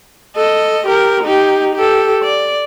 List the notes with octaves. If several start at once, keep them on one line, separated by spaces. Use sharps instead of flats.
A4 D#5
G4 A#4
D#4 G4
G4 A4
D5